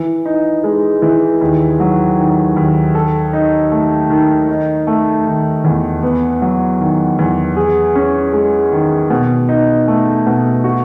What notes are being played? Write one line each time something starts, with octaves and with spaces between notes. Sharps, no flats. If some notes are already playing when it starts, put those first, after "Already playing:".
Already playing: E3
D#4
G#3
E3
D#2
F#3
D#3
D#2
A4
D#4
A3
D#3
D#4
A3
D#3
E2
B3
F#3
D#3
E2
G#4
C#4
G#3
D#3
B2
D#4
A3
B2
F#4